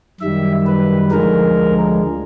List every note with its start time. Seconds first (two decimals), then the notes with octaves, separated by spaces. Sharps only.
0.20 F#2 D#3 G3 E5
0.66 B4
1.11 D2 D3 F3 G#3 A#4